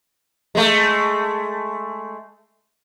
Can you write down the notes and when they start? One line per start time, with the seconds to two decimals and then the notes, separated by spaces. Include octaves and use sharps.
0.55 G#3 A3